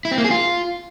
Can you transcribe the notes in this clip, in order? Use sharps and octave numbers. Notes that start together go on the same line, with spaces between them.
E4
C4
A#3
G#4
F4